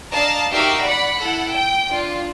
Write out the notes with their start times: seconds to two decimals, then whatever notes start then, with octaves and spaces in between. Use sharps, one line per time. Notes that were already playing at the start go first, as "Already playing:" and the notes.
0.14 D4 D5 D#5 F5 A5 A#5
0.53 D#4 F#4 G4 A#4 E5 F5
0.84 D5 F#5 B5 C#7
1.18 E4 A4 F#5
1.50 G5
1.91 D4 F4